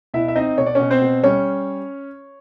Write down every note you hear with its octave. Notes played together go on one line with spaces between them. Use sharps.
B2 E4 E5
E5
C4 D#4 D#5
B2 C#5
D5
B2 C#4 C#5
C4 C5
B2
G3 C#4 C#5